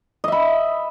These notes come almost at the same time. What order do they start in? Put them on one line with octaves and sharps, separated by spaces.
D#5 E5 B5